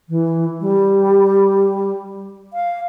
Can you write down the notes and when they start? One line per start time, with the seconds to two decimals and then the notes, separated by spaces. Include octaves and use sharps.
0.09 E3
0.61 G3
2.53 F5